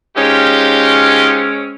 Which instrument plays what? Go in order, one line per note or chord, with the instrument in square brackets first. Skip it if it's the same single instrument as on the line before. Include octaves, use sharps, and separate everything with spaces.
[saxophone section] G#3 C4 C#4 [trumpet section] D#4 F4 G4